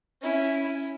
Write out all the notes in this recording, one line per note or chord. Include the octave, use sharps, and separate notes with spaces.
C#4 E4